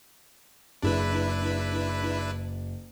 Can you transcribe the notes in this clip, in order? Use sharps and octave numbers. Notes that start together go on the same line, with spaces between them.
F#1 D4 E4 G#4 B4